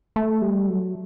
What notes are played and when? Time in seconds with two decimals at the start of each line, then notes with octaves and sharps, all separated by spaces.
0.16 A3
0.42 G3
0.68 F#3